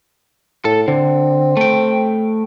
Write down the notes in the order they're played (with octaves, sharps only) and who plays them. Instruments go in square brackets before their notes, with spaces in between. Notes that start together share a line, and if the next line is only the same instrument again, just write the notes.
[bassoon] A2 [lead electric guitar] A4
[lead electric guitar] D3 [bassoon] C4
[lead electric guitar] A3 G5